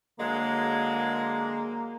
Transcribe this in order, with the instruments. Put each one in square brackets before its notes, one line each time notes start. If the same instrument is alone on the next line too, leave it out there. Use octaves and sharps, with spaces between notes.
[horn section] D3 F#3 G#3 [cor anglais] A#3